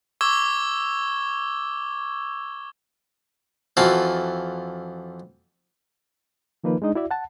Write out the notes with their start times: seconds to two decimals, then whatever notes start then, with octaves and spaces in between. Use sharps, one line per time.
0.21 C#6 D6 E6 G#6 G7
3.77 F2 E3 F4 F#4 A4 F5
6.64 D#3 F3 A#3 D#4 B4
6.82 G#3 D4 D#4 D#5
6.95 E4 F#4 D5 E5
7.11 F#5 A5